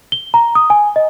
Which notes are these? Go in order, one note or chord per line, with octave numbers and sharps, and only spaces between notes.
G7
A#5
D#6
G#5
D#5